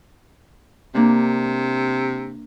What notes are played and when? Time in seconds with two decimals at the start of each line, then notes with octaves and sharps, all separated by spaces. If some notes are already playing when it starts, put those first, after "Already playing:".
0.95 C3 A#3 D4